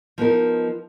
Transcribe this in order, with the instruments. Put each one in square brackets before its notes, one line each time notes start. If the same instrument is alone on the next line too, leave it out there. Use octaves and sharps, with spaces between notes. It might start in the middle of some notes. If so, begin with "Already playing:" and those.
[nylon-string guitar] F3 B3 D#4 A#4